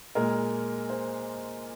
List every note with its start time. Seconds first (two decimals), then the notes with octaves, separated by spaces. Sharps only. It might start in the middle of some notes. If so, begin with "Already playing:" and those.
0.15 A#2 G#3 A#4
0.90 C5